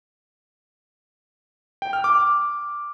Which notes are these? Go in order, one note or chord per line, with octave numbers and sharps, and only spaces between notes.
G5
F6
D6